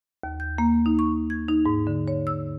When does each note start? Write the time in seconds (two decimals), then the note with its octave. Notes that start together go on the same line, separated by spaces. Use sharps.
0.23 D#2
0.40 G6
0.58 A#3
0.86 D#4
0.99 C#6
1.30 G#6
1.48 D#4
1.66 G#2
1.87 D3
2.08 C#5
2.27 E6